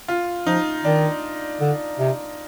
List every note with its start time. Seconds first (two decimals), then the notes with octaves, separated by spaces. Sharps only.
0.08 F4
0.46 F3 D#4
0.85 D#3 D4
1.60 D3
1.99 C3